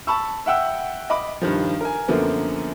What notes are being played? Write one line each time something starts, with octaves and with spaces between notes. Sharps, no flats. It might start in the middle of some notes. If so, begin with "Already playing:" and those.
A5 B5 C#6 E6
E5 F#5 G5 E6
D#5 B5 D6
G2 D#3 F3
A#4 G#5
F#2 D3 F3 A#3 B3